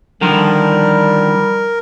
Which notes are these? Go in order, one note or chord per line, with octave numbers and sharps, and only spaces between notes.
D3 D#3 F3 G3 A#4